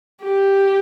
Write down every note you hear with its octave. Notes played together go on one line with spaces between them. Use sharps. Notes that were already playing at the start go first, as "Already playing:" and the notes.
G4